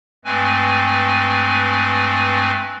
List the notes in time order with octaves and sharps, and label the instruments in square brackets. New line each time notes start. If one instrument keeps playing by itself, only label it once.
[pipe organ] G2 G#3 A3 C4 B4 G#5